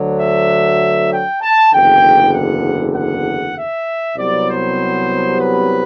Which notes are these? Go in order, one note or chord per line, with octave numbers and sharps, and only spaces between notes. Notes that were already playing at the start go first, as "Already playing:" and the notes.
Already playing: D2 D3 F#3
E5
G5
A5
F#1 E2 D3 G5
F#5
F#5
E5
C2 C3 F#3 B3 D5
C5
B4